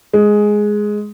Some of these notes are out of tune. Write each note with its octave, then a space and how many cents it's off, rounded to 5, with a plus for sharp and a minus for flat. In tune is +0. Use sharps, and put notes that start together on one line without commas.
G#3 +5